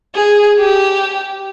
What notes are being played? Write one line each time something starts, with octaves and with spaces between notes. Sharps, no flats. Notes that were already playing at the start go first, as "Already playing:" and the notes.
G#4
G4